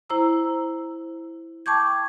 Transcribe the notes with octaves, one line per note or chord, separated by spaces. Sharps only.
E4 C5 A#5 E6
G5 A5 C#6 D6 G6 G#6